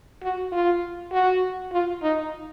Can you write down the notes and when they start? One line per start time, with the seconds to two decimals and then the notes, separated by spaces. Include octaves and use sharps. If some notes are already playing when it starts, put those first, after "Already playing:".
0.22 F#4
0.52 F4
1.12 F#4
1.72 F4
2.02 D#4